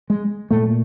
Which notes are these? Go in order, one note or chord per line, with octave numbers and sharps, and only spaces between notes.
G#3
A#2 A3